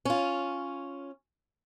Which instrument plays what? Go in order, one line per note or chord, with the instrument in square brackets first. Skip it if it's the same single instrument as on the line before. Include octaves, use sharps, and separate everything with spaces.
[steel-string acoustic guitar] C#4 F4